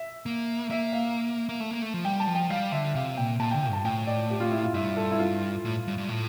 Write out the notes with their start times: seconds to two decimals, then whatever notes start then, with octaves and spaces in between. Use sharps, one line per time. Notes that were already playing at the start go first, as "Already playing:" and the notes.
Already playing: E5
0.26 A#3
0.70 A#3 E5
0.93 F5
1.49 A#3
1.60 A3
1.71 A#3
1.82 A3
1.94 F3
2.05 G3 G5
2.20 A5
2.28 F3
2.35 G5
2.50 G3 F5
2.72 D3 E5
2.95 C3 F5
3.17 A#2 G5
3.40 A#2 A5
3.51 G5
3.54 D3
3.62 G5
3.70 G2 A5
3.84 A2 G5
4.07 D5
4.30 G4
4.40 F4
4.52 E4
4.64 F4
4.74 G2 E5
4.97 A4
5.11 E4
5.19 F4
5.65 A2
5.88 G2
5.98 G2
6.09 A2